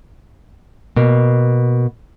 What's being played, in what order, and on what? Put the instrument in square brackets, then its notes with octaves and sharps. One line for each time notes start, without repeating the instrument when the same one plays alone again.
[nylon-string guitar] B2 A#3